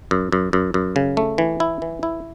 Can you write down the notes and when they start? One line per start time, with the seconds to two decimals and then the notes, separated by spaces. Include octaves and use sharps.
0.11 F#2
0.32 F#2
0.53 F#2
0.74 F#2
0.96 C#3
1.17 A3
1.38 E3
1.60 E4
1.82 E3
2.03 E4